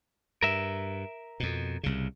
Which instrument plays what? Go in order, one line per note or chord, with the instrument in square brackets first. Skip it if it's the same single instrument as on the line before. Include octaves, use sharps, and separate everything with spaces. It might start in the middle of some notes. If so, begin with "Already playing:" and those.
[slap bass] G2 [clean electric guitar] A#4 E5
[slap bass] F2 B2
C2 C#3